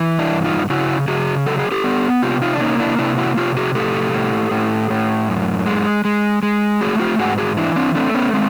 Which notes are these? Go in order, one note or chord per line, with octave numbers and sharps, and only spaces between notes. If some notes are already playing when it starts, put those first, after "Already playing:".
Already playing: E3
D4 E4
G2
D#4 F4
C#3 E4 F#4
C#3 F#4 G#4
F#3 A4
G#4
G4 A4
B3
C3 F4 G4
D#4 F4
D4
A#3 C#4 D#4
D4 E4
C3 D4 E4
E4 F#4
C3 F4 G4
F#4 G#4
A2 G4 A4
A2
A2
A2
F#2
G#3
G#3
G#3
A3 F#4 G#4
F4 G4
G#2 F#4 G#4
F#4 G#4
E3 D4 E4
C4 D4
A3 C4 D4
B3 C#4
G#3 C4